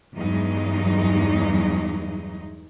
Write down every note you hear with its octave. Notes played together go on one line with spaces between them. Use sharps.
E2 G2 F#3 G#3 D#4